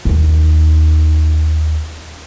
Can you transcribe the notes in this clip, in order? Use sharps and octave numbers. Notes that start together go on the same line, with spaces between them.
D#2 D#4